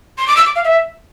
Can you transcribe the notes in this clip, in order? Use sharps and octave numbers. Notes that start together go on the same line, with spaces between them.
C6
D6
E6
D6
F5
E5